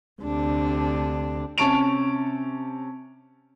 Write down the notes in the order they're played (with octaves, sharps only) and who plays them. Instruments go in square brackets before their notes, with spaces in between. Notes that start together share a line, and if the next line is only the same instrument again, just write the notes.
[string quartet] D2 C3 D4
[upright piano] C3 C#4 A5 C#6 D7 F7